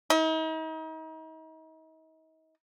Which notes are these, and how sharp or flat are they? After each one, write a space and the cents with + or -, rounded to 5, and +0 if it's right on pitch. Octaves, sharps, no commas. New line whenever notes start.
D#4 +40